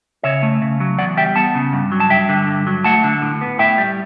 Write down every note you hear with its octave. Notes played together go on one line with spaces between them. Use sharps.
C#3 C#5 E5
A3
C#3
F#3
E2 D5 F#5
G3 E5 G5
B3 F#5 A5
C#3
G2
F#3
A5
G2 E5 G5
D3
G2
F#3
A3 F#5 A5
D3
A2
B3
A2 E5 G5
G3